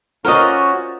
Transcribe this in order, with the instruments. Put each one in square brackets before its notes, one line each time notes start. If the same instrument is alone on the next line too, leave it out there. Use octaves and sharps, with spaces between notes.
[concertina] C#4 F#4 [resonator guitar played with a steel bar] F4 C5 D5 [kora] A#4 D#5